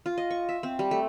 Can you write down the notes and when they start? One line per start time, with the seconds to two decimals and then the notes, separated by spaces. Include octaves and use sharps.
0.06 F4
0.18 D#5
0.31 C#6
0.49 E5
0.63 C4
0.79 G3
0.91 A3